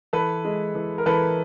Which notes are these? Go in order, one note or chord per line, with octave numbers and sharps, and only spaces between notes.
E3 A4 B4
G#3
E3
A#4
E3 A4 B4